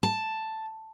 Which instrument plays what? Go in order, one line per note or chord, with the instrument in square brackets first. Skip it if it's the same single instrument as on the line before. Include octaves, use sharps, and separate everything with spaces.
[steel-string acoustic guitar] A5